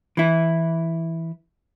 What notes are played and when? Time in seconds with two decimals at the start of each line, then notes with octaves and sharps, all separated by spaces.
0.17 E3 E4